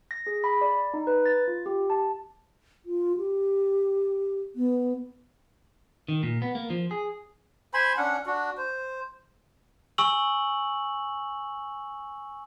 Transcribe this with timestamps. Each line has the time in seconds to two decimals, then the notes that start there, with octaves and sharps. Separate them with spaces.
0.11 A#6
0.27 G#4
0.44 B5
0.61 D5
0.94 D#4
1.07 B4
1.26 A6
1.48 F4
1.66 G4
1.90 A5
2.86 F4
3.17 G4
4.56 B3
6.08 D#3
6.23 A#2
6.42 B3
6.55 A#3
6.70 F3
6.91 G#4
7.74 C5 G#5 B5 C6
7.97 C#4 D4 F#5
8.26 D4 F#4
8.57 C5
9.98 G#5 C#6 E6 F#7